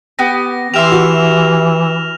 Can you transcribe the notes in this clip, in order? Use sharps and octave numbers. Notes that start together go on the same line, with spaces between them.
B3 G4 A#6
E3 G4 E5 C6 F6 E7 F7
F#4